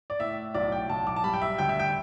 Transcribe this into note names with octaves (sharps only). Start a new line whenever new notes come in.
D5
A2 E5
B1 D5
G5
B1 A5
D6
A5
G3 B5
G5
E5
D2 G5
E5
G5